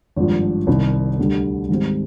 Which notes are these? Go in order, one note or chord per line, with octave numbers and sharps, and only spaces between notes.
G#1 G2 F3
C2 C3 D#3
D2 D3 G3
G#2 D#3 G3 C4